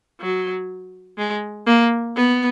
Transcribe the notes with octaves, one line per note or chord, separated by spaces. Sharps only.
F#3
G#3
A#3
B3